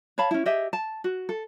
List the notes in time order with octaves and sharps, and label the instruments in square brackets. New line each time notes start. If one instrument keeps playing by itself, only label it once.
[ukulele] C#5 F5 A5 B5
C#4 E4
G4 G#4 D#5 E5
A5
F#4
A4